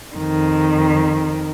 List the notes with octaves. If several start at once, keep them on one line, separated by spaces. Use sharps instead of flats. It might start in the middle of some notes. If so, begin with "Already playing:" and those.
F2 D#3